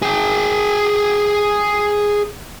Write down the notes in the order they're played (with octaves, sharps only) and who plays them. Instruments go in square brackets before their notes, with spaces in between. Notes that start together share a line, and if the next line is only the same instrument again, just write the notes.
[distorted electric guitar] G#4 G5